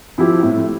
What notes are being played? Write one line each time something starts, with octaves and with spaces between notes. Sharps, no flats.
F3 C4 E4 G4
A2